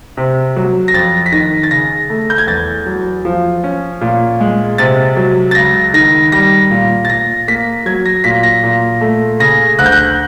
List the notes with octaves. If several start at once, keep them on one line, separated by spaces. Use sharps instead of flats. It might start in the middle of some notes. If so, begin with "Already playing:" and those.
C3
F#3
A#6
F2 A6
B6
D#3 A#6
A6
C#3 A#6
A3
G6
G#6
E2 A6
F#3
F3
C#4
A#2
G#3
C3 A6
F#3
A6
C#2 A#6
D#3 A#6
G3 A#6
A#2
A6
A#2 A#6
A#3 B6
F#3 G#6
A#6
A#2 B6
A#6
A#2
A3
C#3 A#6
D2 F#6
G6
F#6